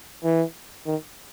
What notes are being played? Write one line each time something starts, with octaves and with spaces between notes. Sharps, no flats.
E3
D#3